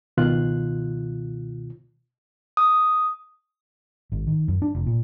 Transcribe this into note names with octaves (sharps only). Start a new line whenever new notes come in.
C#2 B2 D#3 F4 F#6
D#6
G#1
D#3
F#2
D4
F1
A#2